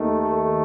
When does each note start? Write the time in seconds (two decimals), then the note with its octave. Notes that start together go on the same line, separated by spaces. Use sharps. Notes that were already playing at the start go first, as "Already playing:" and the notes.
Already playing: D#2 D#3 A3
0.20 A4